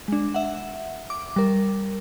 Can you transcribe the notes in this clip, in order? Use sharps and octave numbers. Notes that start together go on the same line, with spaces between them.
G#3 D4
E5 F#5
D6
G3 A#4